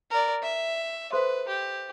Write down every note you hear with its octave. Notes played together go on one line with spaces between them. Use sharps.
A#4 D5
E5
A4 B4 C5 C6
G4